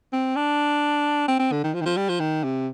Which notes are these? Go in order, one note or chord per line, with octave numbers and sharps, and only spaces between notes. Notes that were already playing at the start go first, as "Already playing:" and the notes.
C4
D4
C4
C4
D3
D#3
F3
D#3
F3
G3
F3
D#3
C3